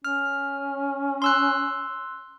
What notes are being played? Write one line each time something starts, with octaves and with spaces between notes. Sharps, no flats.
C#4 F6
C6 E6 F#6